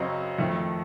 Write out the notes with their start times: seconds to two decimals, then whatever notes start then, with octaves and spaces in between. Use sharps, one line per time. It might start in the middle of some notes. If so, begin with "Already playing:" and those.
Already playing: F#2 C#3 F#3 C4 D#5
0.38 F2 D#3 A3